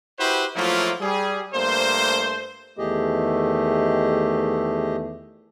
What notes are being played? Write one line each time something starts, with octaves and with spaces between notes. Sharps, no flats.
E4 F#4 G4 B4 C5
F3 F#3 A3 A#3 E4 F4
G3 G#4
G2 A3 A#3 C5
E2 D#3 A3 G4 G#4 D#5